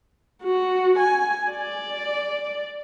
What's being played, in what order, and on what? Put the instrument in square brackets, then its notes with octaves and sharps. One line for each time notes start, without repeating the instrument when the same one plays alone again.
[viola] F#4
G#5
D5